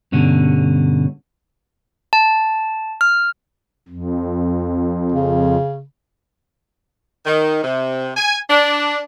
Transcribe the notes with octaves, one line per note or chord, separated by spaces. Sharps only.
G2 B2 D3 C#4
A5
F6
F2
C#3
D#3
C3
G#5
D4